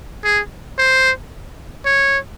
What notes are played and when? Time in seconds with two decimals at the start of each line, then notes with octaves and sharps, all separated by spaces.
0.24 G#4
0.78 C5
1.86 C#5